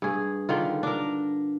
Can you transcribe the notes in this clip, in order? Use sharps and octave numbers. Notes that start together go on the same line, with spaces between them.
G2 G#4
D3 D#3 F4
D4 A#4